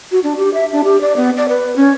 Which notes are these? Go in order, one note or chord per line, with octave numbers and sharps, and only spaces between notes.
F#4
D4
G4
E5
D4
G4
D5
B3
D5
B4
C#4